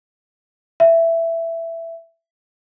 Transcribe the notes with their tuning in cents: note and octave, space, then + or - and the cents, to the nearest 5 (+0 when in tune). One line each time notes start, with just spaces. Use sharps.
E5 +10